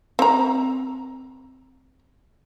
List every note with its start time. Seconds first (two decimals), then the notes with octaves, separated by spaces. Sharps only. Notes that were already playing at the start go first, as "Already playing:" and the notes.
0.19 C4 A#5